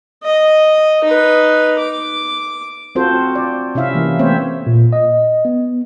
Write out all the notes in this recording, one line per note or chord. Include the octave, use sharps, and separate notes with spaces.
D#5
D#4 B4
D6
C4 F4 F#4 A4 C5
D5
C3 C#4 E4 E5 F5
E3 A#3
A3 B3 C4 C5 C#5 E5
A#2
D#5
B3